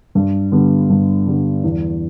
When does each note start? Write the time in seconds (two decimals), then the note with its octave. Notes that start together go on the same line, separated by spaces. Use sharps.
0.15 G2
0.52 D3 G3 B3
0.90 G2
1.27 D3 G3 B3
1.63 E2